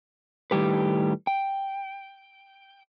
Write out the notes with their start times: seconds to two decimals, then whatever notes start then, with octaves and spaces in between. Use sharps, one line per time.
0.51 A2 D#3 G3 G4 B4
1.27 G5